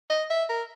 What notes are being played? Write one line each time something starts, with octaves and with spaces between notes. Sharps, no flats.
D#5
E5
A#4